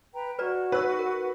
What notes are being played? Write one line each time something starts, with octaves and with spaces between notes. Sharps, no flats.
B4 G5 A#5
F#4 B4 D5 A#5
D#4 B4 E6 F#6
A#4